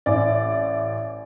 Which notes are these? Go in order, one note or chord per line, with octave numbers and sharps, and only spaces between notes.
A1 D5